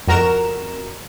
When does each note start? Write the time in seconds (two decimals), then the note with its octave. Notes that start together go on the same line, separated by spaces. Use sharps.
0.07 F2 F#4 A#4 A#5 E7